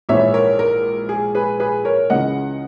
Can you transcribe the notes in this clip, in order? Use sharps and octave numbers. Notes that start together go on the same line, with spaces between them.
A#1 G#2 E3 C#5 E5
A#4 C#5
A#4
G#4
G#4 B4
G#4 B4
A#4 C#5
C#2 C#3 E3 D#5 F#5